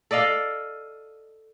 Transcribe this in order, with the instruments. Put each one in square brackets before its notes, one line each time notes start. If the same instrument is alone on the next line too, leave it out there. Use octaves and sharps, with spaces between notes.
[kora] A4 D5 D#5 F5